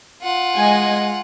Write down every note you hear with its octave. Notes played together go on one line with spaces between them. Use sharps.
F4 F#5
G#3 D#5 G#5